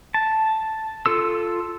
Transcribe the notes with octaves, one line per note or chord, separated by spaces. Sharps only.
A5
F4 A4 E6